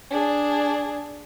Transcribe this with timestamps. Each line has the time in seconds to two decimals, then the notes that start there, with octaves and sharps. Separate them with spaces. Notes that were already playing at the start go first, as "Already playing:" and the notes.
0.10 D4 G#4